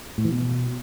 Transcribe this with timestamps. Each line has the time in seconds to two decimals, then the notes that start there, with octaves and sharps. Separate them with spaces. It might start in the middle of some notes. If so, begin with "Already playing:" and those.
0.18 A2
0.25 E3
0.31 B2